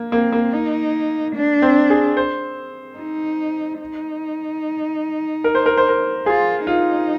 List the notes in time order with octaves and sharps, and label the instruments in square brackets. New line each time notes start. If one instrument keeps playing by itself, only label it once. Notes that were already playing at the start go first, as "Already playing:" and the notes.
Already playing: [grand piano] A#3
[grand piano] A#3 [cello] C4
[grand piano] A#3
[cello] D#4
D4
[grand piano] C4
G#4
C5
[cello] D#4
D#4
[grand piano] A#4
C5
A#4
C5
A#4
[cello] F4 [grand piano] G#4
[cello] D#4 [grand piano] F4